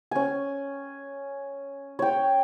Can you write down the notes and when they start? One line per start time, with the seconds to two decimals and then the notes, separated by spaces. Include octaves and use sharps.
0.11 C#4 G#5
1.99 C#5 G5